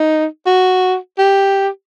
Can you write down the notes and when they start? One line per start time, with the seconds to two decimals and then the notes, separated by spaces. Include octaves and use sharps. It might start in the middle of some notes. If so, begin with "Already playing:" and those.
Already playing: D#4
0.46 F#4
1.18 G4